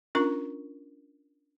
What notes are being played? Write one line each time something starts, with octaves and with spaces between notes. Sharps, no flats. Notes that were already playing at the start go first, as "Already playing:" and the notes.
C#4 D4 F4 A#4 C#6